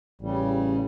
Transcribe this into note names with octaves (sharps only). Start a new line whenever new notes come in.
A1 C#3 G3